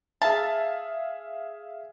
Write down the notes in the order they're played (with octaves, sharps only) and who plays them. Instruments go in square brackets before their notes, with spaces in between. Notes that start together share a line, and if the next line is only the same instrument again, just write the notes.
[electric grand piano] G#4 E5 F5 [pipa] A5